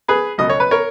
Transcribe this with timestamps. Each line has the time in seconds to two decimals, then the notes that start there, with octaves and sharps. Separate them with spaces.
0.08 G#4 B4
0.38 C#2 B2 F#3 D#5
0.50 C#5
0.60 B4
0.71 A#4 C#5